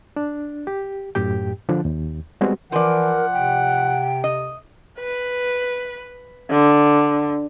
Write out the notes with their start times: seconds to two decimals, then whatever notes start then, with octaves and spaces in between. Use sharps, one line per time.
0.16 D4
0.67 G4
1.15 F#2 A2 G4 G5
1.69 D3 F3 D4
1.85 D#2
2.41 G3 G#3 B3 C4 F#4
2.72 E3 F3 A#4 D5 F#5
3.33 C3 G5
4.24 D#5
4.99 B4
6.51 D3